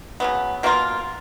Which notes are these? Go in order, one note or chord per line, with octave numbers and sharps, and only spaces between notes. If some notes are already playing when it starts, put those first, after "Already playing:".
C#3 F#3 B3
B2 A#3 F4 A#4